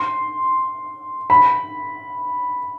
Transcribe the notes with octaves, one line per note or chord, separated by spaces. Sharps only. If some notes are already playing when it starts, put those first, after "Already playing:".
Already playing: C6
B5